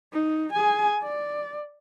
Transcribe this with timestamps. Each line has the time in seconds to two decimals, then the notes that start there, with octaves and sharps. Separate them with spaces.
0.13 D#4
0.53 G#4 G#5
1.03 D5